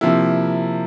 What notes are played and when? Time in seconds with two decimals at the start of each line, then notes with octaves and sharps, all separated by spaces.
0.01 C3 F3 A#3 E4